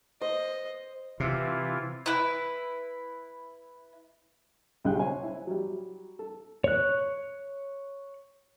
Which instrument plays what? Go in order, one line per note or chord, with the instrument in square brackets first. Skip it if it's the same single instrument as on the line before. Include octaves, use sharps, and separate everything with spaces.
[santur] C5 [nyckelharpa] D#5
[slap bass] C3 [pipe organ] E3 E4 F4
[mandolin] E4 B4
[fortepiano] B1 C#3 G3 G#4 G5 F#6
C5 C#5 G#5
E4
F#3 G3
A4
[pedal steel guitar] C#5 F#6